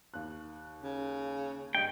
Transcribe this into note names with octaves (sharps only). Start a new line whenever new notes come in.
D#2 F#6
C#3
G2 D#5 G5 C#7